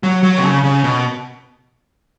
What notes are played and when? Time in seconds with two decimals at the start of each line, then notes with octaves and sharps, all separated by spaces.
0.03 F#3
0.23 F#3
0.38 C3
0.43 C#3
0.64 C#3
0.84 B2